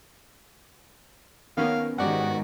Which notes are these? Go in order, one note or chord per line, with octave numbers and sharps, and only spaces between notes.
D#3 A#3 B3 C#4 F5
G#2 D#3 F#4 G4 D5 F#5